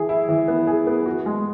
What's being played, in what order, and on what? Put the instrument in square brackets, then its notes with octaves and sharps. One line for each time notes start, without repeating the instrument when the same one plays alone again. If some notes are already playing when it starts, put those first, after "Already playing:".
Already playing: [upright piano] E3 G#4
E4
E3
B3
G#4
B3
F#4
G#3